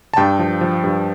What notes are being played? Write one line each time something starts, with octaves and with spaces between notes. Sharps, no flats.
A5
G2 G5
F3
F3
G2